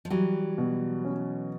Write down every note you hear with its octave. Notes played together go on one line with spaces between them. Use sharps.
F3
E3 F#3 G3
B2
C#4